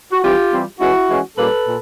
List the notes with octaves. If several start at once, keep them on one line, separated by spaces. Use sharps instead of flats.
F#4
E3 G3 C4 F4 G4
E3 G3 C4
E3 G#3 C#4 E4 F#4
E3 G#3 C#4
A#2 G3 A#3 C#4 A4 B4
A#2